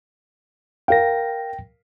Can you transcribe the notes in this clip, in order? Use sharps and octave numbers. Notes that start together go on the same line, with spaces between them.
A#4 F5 G5 A#6